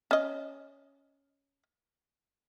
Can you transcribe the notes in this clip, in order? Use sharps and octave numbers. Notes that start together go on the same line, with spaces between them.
C#4 D#5